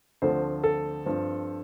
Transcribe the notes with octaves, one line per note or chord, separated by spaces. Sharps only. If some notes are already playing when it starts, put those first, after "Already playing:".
D2 D3 F3 A3 C4 C5
A4
G2 F3 C4